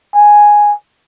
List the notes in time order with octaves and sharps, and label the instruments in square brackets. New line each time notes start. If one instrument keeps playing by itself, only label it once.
[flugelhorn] G#5